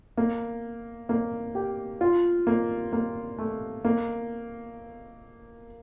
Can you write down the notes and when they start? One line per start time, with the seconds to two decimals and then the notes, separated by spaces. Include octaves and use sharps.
0.17 A#3
1.09 A#3
1.55 G4
2.01 F4
2.47 A#3
2.93 A#3
3.38 A3
3.85 A#3